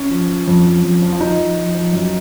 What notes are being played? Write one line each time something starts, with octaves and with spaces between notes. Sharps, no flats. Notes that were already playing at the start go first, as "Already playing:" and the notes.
Already playing: C#4
F3
F3
F2
F3
F2
F3
F4
F3 D#4
F3
F3
F3
F#2